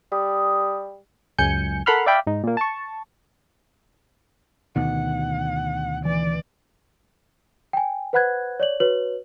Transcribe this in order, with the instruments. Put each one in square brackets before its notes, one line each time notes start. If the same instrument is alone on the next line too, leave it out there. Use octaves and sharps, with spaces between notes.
[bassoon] G3 [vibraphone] D#6
[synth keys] C#2 F#2 G#5 G6 C#7
A4 A#4 F#5 B5 C6 F6
D5 E5 F5 G5 B5
G#2 D#4
A#2 A#3
A5 C#6
[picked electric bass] D2 B2 D#3 [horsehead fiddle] F#5
[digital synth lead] E3 [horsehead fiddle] D5
[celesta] G5 G#5
B4 C5 F#5 B5 F#6 G#6
C#5 D5 F#7
F#4 B4 C#5 F#7